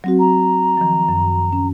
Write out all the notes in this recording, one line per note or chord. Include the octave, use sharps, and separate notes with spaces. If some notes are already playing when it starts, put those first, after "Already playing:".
F#3 C4 F#4
A#5
D#3 F3
F#2
C#4